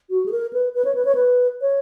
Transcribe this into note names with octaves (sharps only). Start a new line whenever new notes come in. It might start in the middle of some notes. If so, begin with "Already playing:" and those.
F#4
G#4
A#4
B4
B4
C#5
B4
C#5
B4
C#5